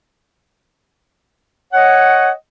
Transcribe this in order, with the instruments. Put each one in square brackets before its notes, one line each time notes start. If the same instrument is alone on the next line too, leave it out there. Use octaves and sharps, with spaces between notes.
[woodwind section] C#5 D#5 F#5